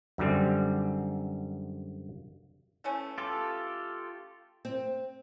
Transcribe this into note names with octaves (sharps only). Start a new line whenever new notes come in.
F#2 D3 G3 C4
E3 A3 C#4
F4 G4 A4
C4